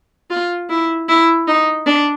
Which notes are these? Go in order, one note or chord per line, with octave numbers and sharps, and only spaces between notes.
F4
E4
E4
D#4
D4